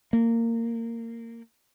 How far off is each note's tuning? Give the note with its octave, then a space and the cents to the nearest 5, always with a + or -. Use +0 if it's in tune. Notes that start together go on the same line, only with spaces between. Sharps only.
A#3 -20